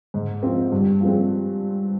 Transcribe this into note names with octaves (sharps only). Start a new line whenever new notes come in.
G#2
F3 C4
G2
F3 G#3 C4